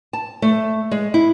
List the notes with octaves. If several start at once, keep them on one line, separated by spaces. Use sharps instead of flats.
A5
A3
G#3
E4